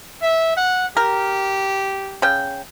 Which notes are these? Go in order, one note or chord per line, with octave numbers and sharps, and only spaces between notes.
E5
F#5
G4 A#4
C#3 G5